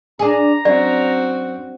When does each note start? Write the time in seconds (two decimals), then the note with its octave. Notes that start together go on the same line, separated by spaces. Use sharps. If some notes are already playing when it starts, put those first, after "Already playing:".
0.19 D4 G#4 A#5
0.65 F#2 C4 F#4 D5